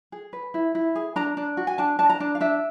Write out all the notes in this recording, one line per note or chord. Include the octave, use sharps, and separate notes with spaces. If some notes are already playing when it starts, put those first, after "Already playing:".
G#4
B4
E4
E4
G#4
D4 A#5
D4
F#4
G#5
D4 A5
D4 A5
A#5
D4
F5
D4 E5